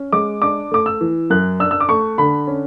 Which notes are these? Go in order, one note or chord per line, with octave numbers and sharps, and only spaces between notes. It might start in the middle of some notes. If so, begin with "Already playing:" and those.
Already playing: C#4
G#3 D6
D4 D6
A3 D6
E6
E3
F#2 F#6
D4 E6
E6
D6
A3 C#6
D3 B5
C#4